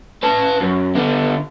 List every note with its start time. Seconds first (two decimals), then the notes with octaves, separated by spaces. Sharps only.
0.23 B4 A5
0.61 F#2
0.96 D3 B3